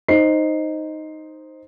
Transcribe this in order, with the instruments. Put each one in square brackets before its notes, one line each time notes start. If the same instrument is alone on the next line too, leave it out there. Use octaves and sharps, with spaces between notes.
[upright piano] D#4 C5 C7